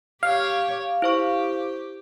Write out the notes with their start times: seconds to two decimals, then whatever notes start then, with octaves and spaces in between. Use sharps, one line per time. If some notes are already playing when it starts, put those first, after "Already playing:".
0.23 G4 C#5 F5
1.02 E4 G4 C5 C#6